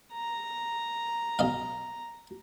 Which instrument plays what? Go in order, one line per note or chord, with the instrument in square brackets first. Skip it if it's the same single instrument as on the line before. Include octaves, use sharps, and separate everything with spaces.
[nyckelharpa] A#5
[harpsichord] B1 D#5 F5